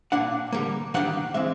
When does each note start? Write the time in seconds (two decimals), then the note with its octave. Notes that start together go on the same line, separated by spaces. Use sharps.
0.12 A#2 F3 A#3 D4 F#5
0.53 D3 G3 A#3
0.94 D#3 G3 A#3 D4 F#5
1.34 E3 G#3 C4 E5